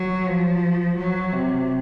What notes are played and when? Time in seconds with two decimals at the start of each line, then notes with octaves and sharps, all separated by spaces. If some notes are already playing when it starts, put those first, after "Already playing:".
Already playing: F#3
0.27 F3
0.97 F#3
1.33 C3